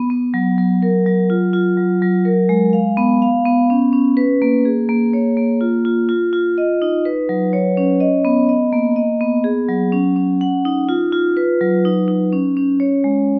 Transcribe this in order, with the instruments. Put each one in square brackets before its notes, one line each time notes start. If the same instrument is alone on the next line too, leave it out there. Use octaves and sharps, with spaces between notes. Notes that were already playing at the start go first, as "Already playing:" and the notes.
Already playing: [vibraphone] B3
B3
F#3
F#3
A#4
F#3
F4
F4
F#3
F#3
A#4
G#3
F5
B3
F5
B3
C#4
C#4
B4
A#3
G#4
A#3
C#5
A#3
F4
F4
F4
F4
D#5
D#4
B4
F#3
C#5
C#4
D#5
B3
D#5
A#3
D#5
B3
G#4
F#3
C#4
C#4
F#5
D#4
F4
F4
B4
F#3
D#4
D#4
C#4
C#4
C#5
G#3